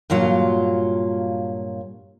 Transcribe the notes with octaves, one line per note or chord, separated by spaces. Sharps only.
G2 A#2 F#3 F4